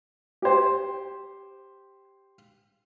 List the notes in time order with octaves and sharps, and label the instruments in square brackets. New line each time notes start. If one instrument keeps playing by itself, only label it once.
[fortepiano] G4 C5